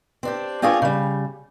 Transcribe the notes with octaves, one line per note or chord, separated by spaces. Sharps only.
C4 D4 G4
C4 D4 F4 G#4 A#4 C#5
C#3 G3